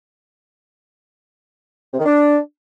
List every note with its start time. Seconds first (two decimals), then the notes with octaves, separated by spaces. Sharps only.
1.93 C3
1.99 D#3
2.06 D4